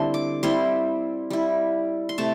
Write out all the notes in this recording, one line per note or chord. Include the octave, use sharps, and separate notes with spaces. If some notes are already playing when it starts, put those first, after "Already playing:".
Already playing: D3 G3 C4 E4 A5 C6
D6
G3 C4 E4 C6
G3 E4
C6
C3 A3 A5